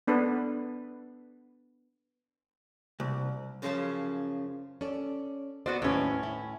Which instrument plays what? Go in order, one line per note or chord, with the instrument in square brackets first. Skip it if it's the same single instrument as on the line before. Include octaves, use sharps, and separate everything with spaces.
[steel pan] B3 D4 A4 B4
[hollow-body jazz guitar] C2
[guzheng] F#2 C#3 F3 C#4 C5 A5
[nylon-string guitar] C#4 A4 D5
[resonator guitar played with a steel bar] B3 F#4 D5 [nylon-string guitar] C5
[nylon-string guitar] D#2 G3 B4 [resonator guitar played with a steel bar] A2 C#4
[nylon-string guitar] E4